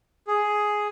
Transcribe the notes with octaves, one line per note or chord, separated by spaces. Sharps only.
G#4